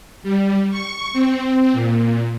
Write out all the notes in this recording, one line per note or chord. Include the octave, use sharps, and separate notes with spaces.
G3
C#6
C4
A#2